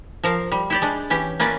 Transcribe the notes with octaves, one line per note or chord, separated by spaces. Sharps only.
F3 A#4 F5
G3
E4 G4 D5
G#3 D4
E3 C#4 G4
A#3 C#4 E4 B4 D5